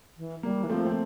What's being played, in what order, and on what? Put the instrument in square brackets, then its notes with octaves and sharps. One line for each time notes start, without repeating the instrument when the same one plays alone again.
[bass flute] E3
[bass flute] G3 [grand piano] A#3
[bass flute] E3
[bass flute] F3 [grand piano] A3 C4
[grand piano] C4